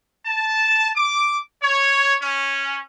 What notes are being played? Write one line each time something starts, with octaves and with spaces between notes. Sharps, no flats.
A5
D6
C#5
C#4